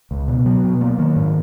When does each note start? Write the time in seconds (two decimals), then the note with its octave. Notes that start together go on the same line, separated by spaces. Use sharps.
0.11 C#2
0.28 B2
0.46 F#3
0.64 B2
0.81 A#3
0.99 D#3
1.16 G#2